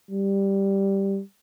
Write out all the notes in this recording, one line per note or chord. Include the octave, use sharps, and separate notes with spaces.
G3